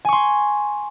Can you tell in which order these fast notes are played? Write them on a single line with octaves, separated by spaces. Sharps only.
G#5 C#6 C6